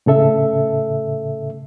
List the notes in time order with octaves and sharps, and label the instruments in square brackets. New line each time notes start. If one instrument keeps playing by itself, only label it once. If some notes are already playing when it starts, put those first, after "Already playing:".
[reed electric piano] A2 C#3 A4 E5